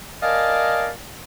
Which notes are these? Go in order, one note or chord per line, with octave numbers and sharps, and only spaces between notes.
A#4 D5 D#5 F5 G#5 A5